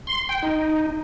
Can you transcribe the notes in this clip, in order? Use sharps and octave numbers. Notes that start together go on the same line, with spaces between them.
C6
G5
D#4